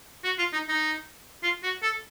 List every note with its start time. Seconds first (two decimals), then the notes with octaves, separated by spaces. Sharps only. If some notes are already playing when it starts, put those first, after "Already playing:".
0.24 F#4
0.39 F4
0.53 D#4
0.69 D#4
1.43 F4
1.63 F#4
1.83 A4